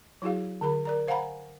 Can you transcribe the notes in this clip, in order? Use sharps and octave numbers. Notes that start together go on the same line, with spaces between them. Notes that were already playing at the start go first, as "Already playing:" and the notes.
F#3 E4 F#4 G#4 F5
D3 G#4 A#4 B5
A#4 D5 A#5
C5 F5 F#5 G#5 A#5 B5